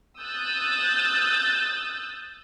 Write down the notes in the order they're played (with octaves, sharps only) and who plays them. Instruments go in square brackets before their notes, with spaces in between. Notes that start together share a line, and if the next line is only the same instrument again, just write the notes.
[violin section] D#6 E6 F#6 G6 A6